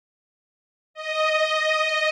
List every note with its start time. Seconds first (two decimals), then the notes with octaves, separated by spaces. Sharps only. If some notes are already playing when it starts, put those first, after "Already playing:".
0.94 D#5